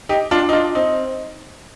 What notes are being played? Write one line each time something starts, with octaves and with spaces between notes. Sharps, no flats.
D#4 G4
D4 F4
D#4
D4 F4
C4 D#4